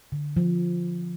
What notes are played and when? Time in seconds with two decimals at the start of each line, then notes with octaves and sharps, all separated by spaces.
0.12 D3
0.37 F3